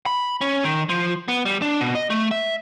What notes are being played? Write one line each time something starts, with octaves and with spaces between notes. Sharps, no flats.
B5
C#4
D#3
F3
B3
G3
D4
B2
D#5
A3
E5